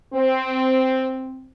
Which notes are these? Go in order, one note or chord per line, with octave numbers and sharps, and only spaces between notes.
C4